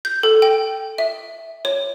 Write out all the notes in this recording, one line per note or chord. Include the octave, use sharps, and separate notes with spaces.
G6
A4
G5
E5
C#5